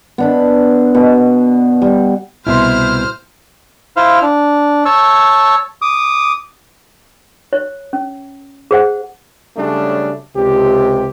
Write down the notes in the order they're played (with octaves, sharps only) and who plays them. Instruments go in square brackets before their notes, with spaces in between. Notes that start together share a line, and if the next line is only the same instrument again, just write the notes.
[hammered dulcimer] B3 D4 B5
B2
G3
[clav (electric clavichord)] C2 B2 [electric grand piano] E4 E5 C6 [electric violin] C5 F6
[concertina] E4 C5 F5
D4
C#5 A5 E6
D6 D#6
[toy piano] C#5
C#4
G#4 C5 F#5
[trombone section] C#3 F#3 G3 A3 C#4 D4
C#2 C3 G4